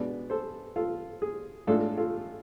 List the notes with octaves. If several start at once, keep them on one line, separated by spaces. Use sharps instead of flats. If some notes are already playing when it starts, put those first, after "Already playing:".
Already playing: B2 G#3 B3 D4 D5
A4 C5
F4 A4
G#4
A2 G#3 D4 F4 A4
F4 A4